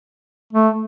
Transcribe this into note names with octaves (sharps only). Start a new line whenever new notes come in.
A3